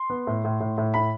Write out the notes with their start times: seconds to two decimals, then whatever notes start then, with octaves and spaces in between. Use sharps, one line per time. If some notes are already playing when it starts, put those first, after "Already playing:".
Already playing: C6
0.10 B3
0.27 A2
0.44 A2
0.60 A2
0.78 A2
0.94 A2 B5